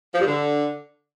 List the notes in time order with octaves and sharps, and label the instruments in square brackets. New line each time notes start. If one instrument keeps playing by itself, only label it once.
[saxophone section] F3
G2
D3